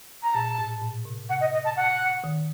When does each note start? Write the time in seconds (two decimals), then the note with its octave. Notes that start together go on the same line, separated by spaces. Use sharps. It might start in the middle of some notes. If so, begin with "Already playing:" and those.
0.23 A#5
0.35 A#2 A5
0.59 A2
0.82 A#2
1.05 C3
1.29 C3 F#5
1.41 D#5
1.53 D#5
1.65 A5
1.77 F#5
2.24 D#3